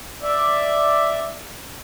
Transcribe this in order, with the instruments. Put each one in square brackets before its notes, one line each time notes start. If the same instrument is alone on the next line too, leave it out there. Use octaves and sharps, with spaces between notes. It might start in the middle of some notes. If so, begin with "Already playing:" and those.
[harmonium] D5 E5